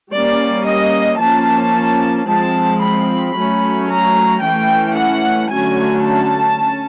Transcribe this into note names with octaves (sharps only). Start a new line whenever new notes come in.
G3 A#3 C#4 D5
D#5
F3 A#3 C#4 A5
F3 G#3 C4 A5
B5
F#3 A3 C#4
A#5
E3 A3 C#4 G5
F#5
D3 F#3 A3 C#4 G#5
A5
C#4